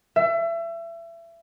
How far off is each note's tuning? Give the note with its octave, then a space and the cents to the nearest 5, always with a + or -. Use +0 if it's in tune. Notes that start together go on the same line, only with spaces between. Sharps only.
E5 +30